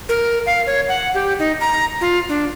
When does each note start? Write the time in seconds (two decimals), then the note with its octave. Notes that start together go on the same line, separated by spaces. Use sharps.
0.09 A#4
0.46 F5
0.67 C#5
0.88 F#5
1.14 G4
1.39 D#4
1.60 A#5
2.01 F4
2.29 D4